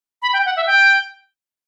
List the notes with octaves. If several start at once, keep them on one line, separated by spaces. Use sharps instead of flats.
B5
G5
F#5
E5
G5